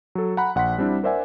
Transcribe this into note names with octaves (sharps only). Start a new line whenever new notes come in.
F#3 A4
F#5 A#5 B5 F#6
A#1 F#5 C6 B6
G3 C4 D4 E4
A#4 C5 D5 E5 F#5 G#5